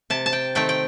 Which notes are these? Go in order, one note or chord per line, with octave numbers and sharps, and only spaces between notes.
C3 A5
A5
G5
D#3 A3 C4 G5
G5